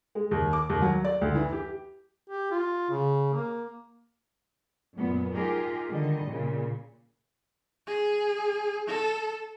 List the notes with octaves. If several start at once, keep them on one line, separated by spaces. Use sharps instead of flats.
G#3
D#2
D6
D#2
F#3
D5
D2
E3
G4
G4
F4
C#3
A#3
F#2 A#2 B3
D#4 F4 G4 G#4 A#4
D3 D#3 G3 D#5
A#2 C#3
G#4
A4